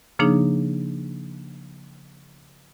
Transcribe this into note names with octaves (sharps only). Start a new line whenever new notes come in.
C#3 F3 A#3 D4 D#4 G#4